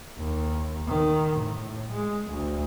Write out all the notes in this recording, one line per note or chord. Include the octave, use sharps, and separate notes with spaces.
D#2
D#3
A2
G#3
D2